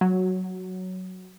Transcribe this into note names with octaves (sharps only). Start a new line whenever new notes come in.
F#3